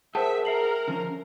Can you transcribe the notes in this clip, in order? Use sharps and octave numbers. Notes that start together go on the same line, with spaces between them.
G#4 A#4 C5 E5 F#5 G5 A5
A#4 E5 C7 F#7
D3 F3 C#4